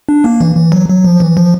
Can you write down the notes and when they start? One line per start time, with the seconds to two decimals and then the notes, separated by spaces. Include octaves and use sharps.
0.09 D4
0.24 A#3
0.40 E3
0.57 E3
0.72 F#3
0.89 F#3
1.04 F3
1.20 E3
1.37 F3